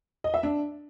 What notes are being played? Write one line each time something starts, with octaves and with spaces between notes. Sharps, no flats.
D#5
E5
D4